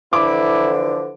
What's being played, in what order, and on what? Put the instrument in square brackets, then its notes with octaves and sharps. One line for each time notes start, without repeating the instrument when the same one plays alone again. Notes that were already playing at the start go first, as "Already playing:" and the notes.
[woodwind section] D3 E3 F3 [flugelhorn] E4 [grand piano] D6